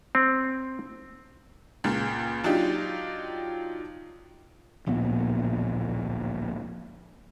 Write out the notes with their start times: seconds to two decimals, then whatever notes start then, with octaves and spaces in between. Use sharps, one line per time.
0.15 C4
1.84 C#2 A#2
2.44 F#3 D4 D#4 F4 G4
4.86 D1 A#1 A#2 B3